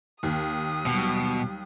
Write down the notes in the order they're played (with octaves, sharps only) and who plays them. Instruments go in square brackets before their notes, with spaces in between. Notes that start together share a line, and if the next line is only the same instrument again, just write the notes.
[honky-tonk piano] D#2 [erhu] D#6
[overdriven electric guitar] B2 [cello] F#3 G3